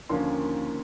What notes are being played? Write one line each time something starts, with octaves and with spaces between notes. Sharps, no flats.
D#2 D3 F3 A#3 C#4 C6